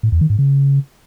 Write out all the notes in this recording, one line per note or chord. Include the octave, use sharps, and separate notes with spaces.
A2
E2
D#3
G#2
C#3